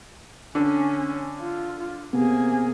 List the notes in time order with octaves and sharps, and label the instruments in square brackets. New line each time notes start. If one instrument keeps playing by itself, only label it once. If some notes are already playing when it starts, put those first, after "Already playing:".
[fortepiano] D3 [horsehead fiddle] C#4
[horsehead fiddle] F4
[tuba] C3 [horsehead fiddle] A#3 G#4 [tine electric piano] B3